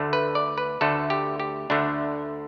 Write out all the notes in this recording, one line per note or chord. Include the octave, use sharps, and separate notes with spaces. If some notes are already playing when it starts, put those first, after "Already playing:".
Already playing: D2 D3 A3
B4
D5
B4
D2 D3 A3 A4
G4
G4
D2 D3 A3 D4